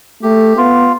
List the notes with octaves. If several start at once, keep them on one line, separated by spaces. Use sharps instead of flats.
A3 G4
B3 F4